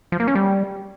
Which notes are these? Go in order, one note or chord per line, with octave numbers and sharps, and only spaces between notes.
F3
A#3
C#4
G3